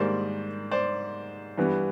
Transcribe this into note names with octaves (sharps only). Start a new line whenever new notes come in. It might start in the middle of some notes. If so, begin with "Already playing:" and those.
Already playing: G#2 D#3 G3 A#3 C5 D5
C5 D5
G2 E3 G3 B3